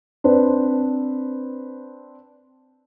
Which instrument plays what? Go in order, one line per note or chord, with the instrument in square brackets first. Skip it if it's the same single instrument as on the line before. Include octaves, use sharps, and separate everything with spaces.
[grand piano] C4 D4 B4 C5